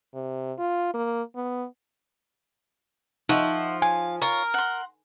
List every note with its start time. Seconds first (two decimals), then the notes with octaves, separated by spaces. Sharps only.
0.14 C3
0.58 F4
0.94 A#3
1.36 B3
3.29 F3 D#4 E5 F#5 C#6
3.82 F5 G#5
4.22 F4 A#4 C#5
4.54 F#5 C6